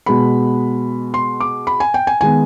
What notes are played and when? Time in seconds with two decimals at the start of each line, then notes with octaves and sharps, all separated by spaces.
0.06 B2 G#3 B3 B5
1.14 C6
1.40 D6
1.67 B5
1.80 G#5
1.94 G5
2.07 G#5
2.21 D#3 G#3 B3 G#5